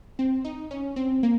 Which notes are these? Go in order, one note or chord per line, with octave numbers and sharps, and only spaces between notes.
C4
D#4
C#4
C4
A#3